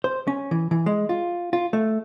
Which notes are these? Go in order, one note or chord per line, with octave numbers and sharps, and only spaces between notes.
C5
C#4
E3
E3
G#3
F4
F4
A3